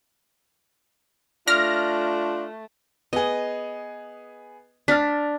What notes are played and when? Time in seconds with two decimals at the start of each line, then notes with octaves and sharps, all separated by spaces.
1.48 A3 D4 F4 F6 A#6
3.13 B3 G#4 D#5
4.88 D4 F6 A6 B6